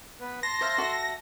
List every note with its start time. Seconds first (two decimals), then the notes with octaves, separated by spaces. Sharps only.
0.20 B3 B4
0.43 A5 C6 A#6
0.61 C5 E5 F5
0.78 F#4 A4 E5